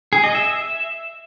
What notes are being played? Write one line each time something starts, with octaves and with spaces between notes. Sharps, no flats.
G#4
D#5
E5